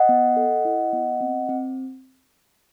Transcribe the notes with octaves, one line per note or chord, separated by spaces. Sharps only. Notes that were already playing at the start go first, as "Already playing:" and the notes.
Already playing: D#5 F#5
B3
A4
E4
B3
C4
C4